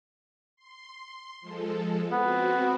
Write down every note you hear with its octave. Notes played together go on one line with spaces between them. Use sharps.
C6
F3 G#3 A4
B3 C4 F#4